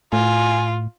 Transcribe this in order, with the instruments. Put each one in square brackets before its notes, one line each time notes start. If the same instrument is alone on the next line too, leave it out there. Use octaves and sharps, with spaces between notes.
[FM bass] A2 [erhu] F4 [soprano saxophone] G#5